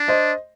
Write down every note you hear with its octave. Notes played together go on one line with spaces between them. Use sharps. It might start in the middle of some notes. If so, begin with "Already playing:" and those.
Already playing: D4
C5 D#5